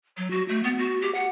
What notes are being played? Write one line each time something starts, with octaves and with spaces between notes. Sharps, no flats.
F#3
F#4
A3
B3
F#4
G4
F#5